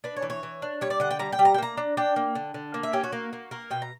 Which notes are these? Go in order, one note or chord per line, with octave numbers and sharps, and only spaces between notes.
D4 B4
C#5
E3
C#5
E3
D4
G3 C#5
D5
D3 F#5
G5
G3 A#5
G5
G3
A#5
G5
A#3 A#5
D4
D4 G5
A#3
D3
D3
A#3
E5
C#4 G4
F#4
A#3
A#3
A#3 A#4
B2 G5
A#5